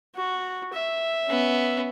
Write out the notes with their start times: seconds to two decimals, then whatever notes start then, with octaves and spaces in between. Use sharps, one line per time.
0.16 F#4
0.73 E5
1.25 B3 C#4